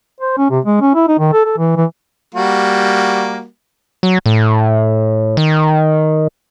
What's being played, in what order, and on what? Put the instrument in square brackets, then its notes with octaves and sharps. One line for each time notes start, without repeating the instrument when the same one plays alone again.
[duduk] C5
C#4
C3
G#3
C#4
E4
D#4
D#3
A4
A4
E3
E3
[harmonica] G3 A#3 F#4
[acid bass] F#3
A2
D#3